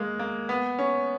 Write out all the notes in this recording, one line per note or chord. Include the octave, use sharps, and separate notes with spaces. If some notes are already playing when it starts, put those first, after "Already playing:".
Already playing: G#3 A#3
A#3
B3
C#4